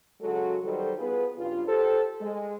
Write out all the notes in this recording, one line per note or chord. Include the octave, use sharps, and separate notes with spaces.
C#3 F#3 G#3 F#4 A4
D#3 F#3 G3 F#4 A4 C5
B3 F4 G#4 B4
G2 C#3 G3 F4
G4 A4 C5
G#3